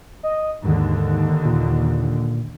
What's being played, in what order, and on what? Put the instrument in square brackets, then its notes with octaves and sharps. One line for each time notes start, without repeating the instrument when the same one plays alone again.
[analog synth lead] D#5
[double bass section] D#2 D3 [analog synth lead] G#2
[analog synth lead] A#2